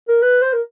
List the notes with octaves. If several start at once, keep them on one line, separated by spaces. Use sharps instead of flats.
A#4
B4
C5
A#4